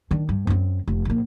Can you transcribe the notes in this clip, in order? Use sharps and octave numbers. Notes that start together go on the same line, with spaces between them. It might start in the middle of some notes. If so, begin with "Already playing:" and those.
D#3 D4
G2
F#2 C4
F1
A#1 A#3